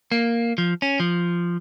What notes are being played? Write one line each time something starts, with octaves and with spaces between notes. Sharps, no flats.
A#3
F3
C#4
F3